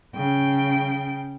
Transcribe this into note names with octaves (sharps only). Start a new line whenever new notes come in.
C#3 G5